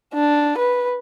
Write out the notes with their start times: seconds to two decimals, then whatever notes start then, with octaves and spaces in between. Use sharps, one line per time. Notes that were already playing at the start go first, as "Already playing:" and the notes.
0.14 D4
0.59 B4